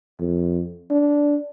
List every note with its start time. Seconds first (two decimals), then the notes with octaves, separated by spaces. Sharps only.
0.20 F2
0.91 D4